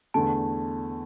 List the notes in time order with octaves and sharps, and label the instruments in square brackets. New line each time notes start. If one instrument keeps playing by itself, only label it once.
[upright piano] E2 D3 A3 [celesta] A5